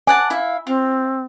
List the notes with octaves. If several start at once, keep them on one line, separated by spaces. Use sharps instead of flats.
D5 F#5 G#5 A5
E4 E5 F5
C4 F4